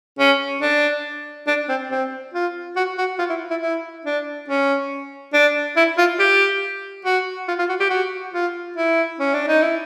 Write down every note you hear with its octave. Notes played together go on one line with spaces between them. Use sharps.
C#4
D4
D4
C4
C4
F4
F#4
F#4
F4
E4
E4
E4
D4
C#4
D4
E4
F4
G4
F#4
F4
F4
F#4
G4
F#4
F4
E4
C#4
D4
D#4
E4